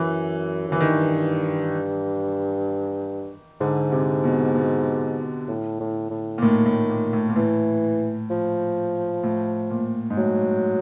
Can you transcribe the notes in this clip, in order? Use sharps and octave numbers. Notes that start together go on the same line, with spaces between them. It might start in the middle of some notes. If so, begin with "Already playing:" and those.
Already playing: F#2 E3
F#2 E3
G2 D#3
G#2 D3
C3
B2
B2
A2
A2
A2
A#2
A2 D#3
A2
A#2
A2
A#2
A2 E3
F3
A2
A#2
G#2
A2 F#3